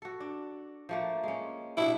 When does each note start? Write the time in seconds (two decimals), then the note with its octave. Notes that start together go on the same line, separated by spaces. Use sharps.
0.02 F#4 A4
0.20 D4
0.89 F3 A3 A#3
1.23 G#3 C#4
1.77 G2 B2 D4 E4